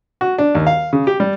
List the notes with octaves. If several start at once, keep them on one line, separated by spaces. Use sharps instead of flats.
F#4
D4
D#2
F5
C#3
G4
G3